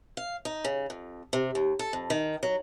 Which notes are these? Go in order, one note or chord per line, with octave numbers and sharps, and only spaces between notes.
F5
D#4
C#3
F2
C3
D#2
A4
F2
D#3
F#3